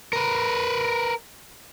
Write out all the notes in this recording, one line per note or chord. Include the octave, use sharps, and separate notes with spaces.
A#4 B4